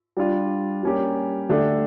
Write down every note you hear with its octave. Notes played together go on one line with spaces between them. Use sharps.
G3 D4 F4
G3 A#3 C#4 G4
D3 A3 D4 G4